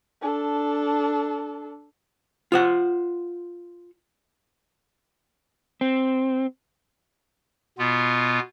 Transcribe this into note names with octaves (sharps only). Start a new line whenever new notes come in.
D4 A4
F4 C5 F#5
C4
B2 B3 F4